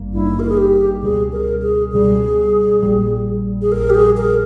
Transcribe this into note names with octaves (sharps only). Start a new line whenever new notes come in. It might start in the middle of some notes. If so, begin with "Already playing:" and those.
Already playing: G#1 G2 G3 A#3
G#1 G2 G3 A#3 D#4 E4
A#4
G#4
G4
C#2 B2 G3 G#4
A#4
G#4
C#2 B2 G3 G#4
A#1 A#2 G3
G#4
A#1 A#2 G3 A#4
G4
G#4
A#4